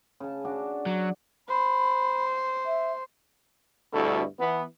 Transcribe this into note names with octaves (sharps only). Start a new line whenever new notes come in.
C#3 A5
D4 F#4 D5
F#3
C5 B5
E5
D2 G2 B2 E4 A4
E3 B3